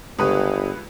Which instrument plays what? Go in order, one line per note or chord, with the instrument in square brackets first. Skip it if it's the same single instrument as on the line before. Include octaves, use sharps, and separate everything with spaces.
[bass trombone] G1 [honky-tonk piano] C#2 B4 [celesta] G4 D#6